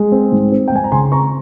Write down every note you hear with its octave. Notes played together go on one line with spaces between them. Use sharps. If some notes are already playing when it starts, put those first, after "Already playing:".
Already playing: G#3
C4
G#2
C4
G5
G#2 G#5
A#5
C#3 G#5 C6
C4 A#5 C#6